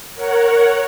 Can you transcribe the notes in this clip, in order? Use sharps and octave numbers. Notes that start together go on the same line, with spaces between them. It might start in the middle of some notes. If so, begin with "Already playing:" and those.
A#4 C#5 F#5